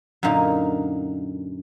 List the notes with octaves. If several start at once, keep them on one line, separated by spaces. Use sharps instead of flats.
F#2 A#2 D3 A#3 D#4